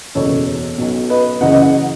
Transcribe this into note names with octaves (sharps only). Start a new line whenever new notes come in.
F#1 E2 B2 A4 C#5
B1 B2
B4 D#5
F#1 F#2 C#3 E3 D#5 F#5
D#5 F#5
D#5 F#5